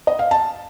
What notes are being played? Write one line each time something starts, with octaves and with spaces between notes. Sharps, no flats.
D#5
F5
A5